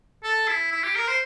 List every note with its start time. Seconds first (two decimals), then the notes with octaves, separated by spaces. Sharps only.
0.24 A4
0.48 E4
0.72 E4
0.83 G4
0.96 A#4
1.08 C5